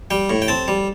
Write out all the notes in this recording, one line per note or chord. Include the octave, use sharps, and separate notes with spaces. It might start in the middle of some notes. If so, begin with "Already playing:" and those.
G3 G5
A2
G5
C4 A5
G3